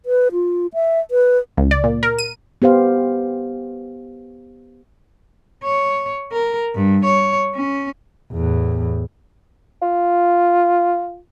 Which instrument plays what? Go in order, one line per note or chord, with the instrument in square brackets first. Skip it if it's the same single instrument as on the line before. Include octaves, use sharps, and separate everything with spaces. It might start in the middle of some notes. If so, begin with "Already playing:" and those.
[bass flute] B4
F4
E5
B4
[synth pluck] C#2
D5
A#2
A#4
D#7
[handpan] B3 G4 C5 F5
[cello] C#5
A#4
G2
C#5
C#4
[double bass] E2 A2
[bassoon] F4